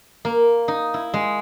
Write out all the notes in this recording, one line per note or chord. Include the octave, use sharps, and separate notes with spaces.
A#3
D#4
E4
G#3